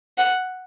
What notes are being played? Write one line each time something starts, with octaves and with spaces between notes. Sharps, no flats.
F#5